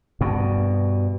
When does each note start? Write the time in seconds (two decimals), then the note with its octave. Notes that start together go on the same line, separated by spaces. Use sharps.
0.21 G2 B2